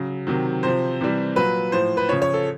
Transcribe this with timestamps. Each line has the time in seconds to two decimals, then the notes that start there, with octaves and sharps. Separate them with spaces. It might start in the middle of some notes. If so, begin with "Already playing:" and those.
Already playing: C#3 F#3
0.27 C3 D#3 F#3
0.63 C3 F3 C5
1.01 C3 E3 G3
1.36 A#2 F#3 B4
1.72 A2 F3 C5
1.97 B4
2.09 C#3 F3 C#5
2.22 C#5
2.34 A4